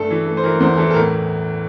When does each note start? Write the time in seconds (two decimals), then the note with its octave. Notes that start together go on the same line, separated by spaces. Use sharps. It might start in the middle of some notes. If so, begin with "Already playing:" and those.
Already playing: G2 A3 A4
0.10 E3
0.27 A3
0.37 C5
0.43 E3 A#4
0.60 E2 C5
0.77 E3 A4
0.90 A4
0.94 A2 A#4